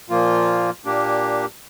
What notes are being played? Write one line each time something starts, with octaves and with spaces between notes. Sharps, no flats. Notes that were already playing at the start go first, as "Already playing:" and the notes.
A#2 F3 A#3 F4
A#2 A#3 D4 G4